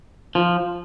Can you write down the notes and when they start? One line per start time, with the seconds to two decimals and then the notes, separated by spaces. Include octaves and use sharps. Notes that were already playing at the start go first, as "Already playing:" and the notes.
0.35 F3